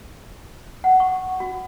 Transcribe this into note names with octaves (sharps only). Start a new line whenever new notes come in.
F#5
C#6
F#4